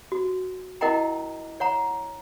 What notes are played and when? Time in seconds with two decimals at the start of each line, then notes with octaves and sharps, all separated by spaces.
0.12 F#4
0.81 E4 A#4 D#5 F#5 G5 A#5
1.60 C#5 F#5 A#5